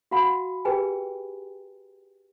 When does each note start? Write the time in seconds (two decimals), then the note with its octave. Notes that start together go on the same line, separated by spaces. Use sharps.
0.11 F#4 F5 F#5 B5
0.65 G4 G#4 A#4 B4 G5 G#5